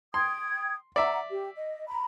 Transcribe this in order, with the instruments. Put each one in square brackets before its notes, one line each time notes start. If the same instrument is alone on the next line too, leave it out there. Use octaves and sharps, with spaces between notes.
[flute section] G5 D#6 G#6 [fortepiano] C6
[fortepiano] D5 E5 [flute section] F#5 A#5
[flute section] G4
D#5
A#5 B5